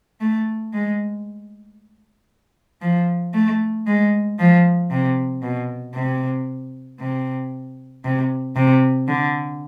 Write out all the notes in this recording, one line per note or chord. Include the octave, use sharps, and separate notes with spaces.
A3
G#3
F3
A3
G#3
F3
C3
B2
C3
C3
C3
C3
D3